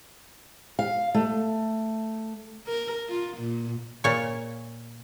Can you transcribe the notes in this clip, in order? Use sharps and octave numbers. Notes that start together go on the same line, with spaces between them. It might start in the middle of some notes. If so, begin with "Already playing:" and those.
F5
A3
A#4
F4
A#2
A#2 C#5